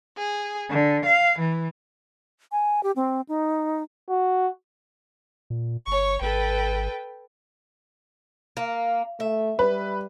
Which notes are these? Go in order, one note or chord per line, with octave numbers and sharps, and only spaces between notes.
G#4
D3
F5
E3
G#5
G4
C4
D#4
F#4
A#2
G1 C#5 C#6
G#1 A4 B4 G5
A#3
A3 E5
G3 B4